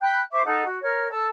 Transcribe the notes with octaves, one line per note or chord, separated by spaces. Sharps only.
G5 B5 F#6 G6
C5 E5 C#6 D6
D#4 A4 F#5
F#4
A#4 C#5 F6
A4 A5 E6